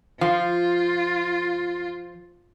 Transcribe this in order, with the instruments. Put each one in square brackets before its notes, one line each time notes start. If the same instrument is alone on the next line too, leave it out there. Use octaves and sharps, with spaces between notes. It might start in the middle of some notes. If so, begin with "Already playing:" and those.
[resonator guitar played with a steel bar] F3 [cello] F4